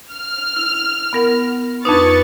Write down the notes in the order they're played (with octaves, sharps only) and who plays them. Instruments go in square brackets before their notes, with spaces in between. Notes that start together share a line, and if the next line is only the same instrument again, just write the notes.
[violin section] F6
[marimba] E4
B3 A#4 F#5
[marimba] F2 D4 D#4 [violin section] B4 C#6 A6